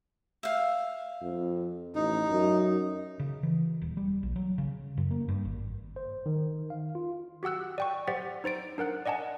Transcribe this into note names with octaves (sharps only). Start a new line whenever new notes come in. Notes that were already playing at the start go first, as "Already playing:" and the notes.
E5 F5
F2
A1 D#4
F#2
C#3
E3
D#1
G3
A#1
F#3
C#3
F#2
A#3
G2
G#1
C5
D#3
F5
F4
F#4 G4 F#5 E6 F#6
D5 G5 C#6
G4 C5 D5 F#5 A6 B6
D#4 C5 A6 D7
D4 A#4 F#5 F#6
D5 D#5 F#5 G#5 A5